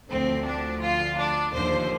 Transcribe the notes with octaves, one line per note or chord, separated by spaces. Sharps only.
D2 D3 F3 C4
D4
F4
D4
D#2 D3 F3 C5